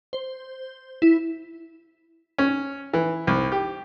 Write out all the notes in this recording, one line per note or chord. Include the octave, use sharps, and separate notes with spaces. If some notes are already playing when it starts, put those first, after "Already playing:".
C5
E4
C#4
E3
C2
G4